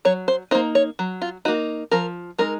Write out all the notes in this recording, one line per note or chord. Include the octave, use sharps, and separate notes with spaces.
F#3 C#5
C5
A#3 D#4 C5
C#5
F#3
F4
A#3 D#4 F#4
F3 A#4
G#3 D#4 A#4